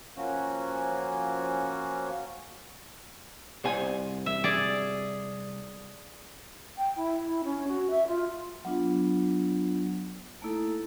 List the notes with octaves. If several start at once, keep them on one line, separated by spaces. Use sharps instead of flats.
F3 A#3 C#4 F#4
C2 C5 G#5
E5
G#4 D5
G5
E4
E4
C#4
F#4
E5
F4
F#3 B3 D4 F4
A3 A#3 D#4 E4 A4